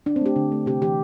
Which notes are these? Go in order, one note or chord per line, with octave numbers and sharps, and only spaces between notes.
D3 D4
C4
A3 G4
D3
A3
C3 G4
E3 G4